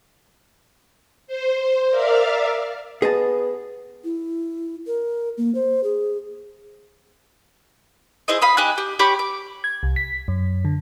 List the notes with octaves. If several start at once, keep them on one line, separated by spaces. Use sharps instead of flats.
C5
A#4 D5 E5 F5 F6
B3 G#4 D#5 A5
E4
A#4
A#3
C5
G#4
E4 G#4 C5 D#5
F5 B5 D#6
D#4 G4 G#5 F#6
G4
G4 C#5 B5 D6
D6
G#6
C2
B6
F#2
D3